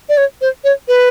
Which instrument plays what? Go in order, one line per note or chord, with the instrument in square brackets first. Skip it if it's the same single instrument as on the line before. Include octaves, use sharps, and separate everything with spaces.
[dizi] D5
C#5
C5
C#5
B4